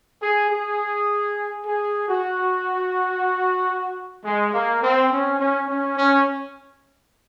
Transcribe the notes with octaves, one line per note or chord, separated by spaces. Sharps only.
G#4
G#4
G#4
F#4
G#3
A#3
C4
C#4
C#4
C#4
C#4